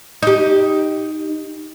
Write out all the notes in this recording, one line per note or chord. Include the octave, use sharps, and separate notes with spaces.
D#4 G4